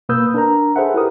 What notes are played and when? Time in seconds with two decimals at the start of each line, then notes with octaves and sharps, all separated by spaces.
0.09 B2 A#3 B4 D#6 E6 G6
0.34 D4 A#4 A#5
0.76 G#4 A4 B4 C5 E5 F#5
0.94 E4 G4 A#4 D#6